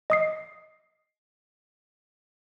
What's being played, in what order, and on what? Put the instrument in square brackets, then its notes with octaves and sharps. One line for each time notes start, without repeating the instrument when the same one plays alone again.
[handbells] D#5 D#6 C7